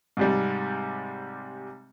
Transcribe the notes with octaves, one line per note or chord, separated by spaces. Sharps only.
G#2 C3 G3